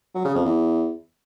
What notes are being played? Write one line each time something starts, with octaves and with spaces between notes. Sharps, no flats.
F#3
C#3
F2
E2